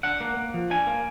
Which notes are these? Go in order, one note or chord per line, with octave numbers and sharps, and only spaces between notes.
D4 F#5
A#3
A#3
F3
D4 G#5
A#3